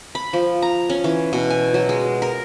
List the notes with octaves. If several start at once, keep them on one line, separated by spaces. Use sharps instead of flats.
B5
F3
A#5
C#4
E3
B2
G#5
F#3
G#3
A#4